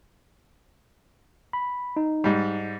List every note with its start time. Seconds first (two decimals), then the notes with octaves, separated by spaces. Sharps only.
1.53 B5
1.97 D#4
2.24 G#2 G3